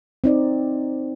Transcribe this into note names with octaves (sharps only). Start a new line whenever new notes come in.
C4 D#4 D5